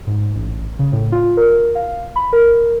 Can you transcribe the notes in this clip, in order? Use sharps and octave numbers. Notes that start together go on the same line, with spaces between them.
G#2
A1
C#3
A2
F4
A#4
F5
B5
A#4